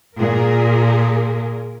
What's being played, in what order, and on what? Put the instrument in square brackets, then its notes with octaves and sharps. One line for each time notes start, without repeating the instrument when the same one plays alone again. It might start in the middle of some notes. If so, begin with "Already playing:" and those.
[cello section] A#2 G#4 A#4